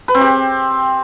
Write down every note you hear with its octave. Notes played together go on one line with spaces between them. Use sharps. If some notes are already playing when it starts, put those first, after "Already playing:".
B4
C4
G4